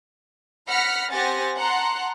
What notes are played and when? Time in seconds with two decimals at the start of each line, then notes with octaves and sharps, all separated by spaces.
0.67 F#5 B5 F6 A#6 B6 C#7
1.12 C4 G4 F#5 G#5 A6 A#6
1.56 F#5 A5 A#5 C6 F#6